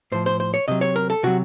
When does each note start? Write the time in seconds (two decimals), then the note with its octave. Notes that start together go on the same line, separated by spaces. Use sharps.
0.12 A2 F3 C5
0.26 C5
0.40 C5
0.54 C#5
0.68 C3 F#3 D#5
0.81 C#5
0.96 A#4
1.10 A4
1.23 C3 F#3 F#4